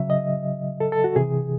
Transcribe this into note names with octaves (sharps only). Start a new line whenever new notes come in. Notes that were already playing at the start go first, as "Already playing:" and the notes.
Already playing: C#3 F#3 E5
D#5
A4
A4
F#4
C3 E3 G#4